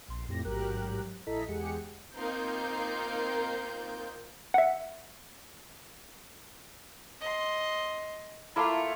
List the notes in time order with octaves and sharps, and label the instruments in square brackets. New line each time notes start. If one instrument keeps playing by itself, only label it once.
[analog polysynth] A#1 C6
F2 A2 G4 A#6
A1 G#2 F#3 G4 A#4 F#6
A#1 E4 A4 D#5 A#5 B6
E2 G#3 G4 G#4 F#5 C#7
[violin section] A#3 C4 D#4 F4 A#4 G6
[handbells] E5 F#5
[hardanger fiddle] D#5 C6
[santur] A3 A#3 E4 [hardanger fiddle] F4